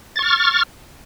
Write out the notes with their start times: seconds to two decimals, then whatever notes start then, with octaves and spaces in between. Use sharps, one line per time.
0.16 A6
0.19 C#6
0.22 F6